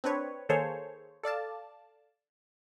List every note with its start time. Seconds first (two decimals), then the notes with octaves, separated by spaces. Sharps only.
0.04 C4 D4 B4 C#5
0.49 D#3 A#3 G#4 A4 C5 C#5
1.23 A4 D5 F5 A5